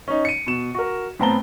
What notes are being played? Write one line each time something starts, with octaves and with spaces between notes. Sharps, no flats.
C#4 D#4
C#7 D#7
B2 E7
F#4 A#4
A2 B3 C4 A5 A#5 G7